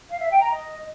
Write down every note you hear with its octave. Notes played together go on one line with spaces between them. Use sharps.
F5
E5
G5
A#5
D#5